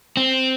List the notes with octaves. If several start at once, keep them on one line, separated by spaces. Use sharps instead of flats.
C4